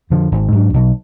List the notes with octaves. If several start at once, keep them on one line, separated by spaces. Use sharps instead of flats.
F2 D3 F3
G#1
G#2 F#3 D4
B1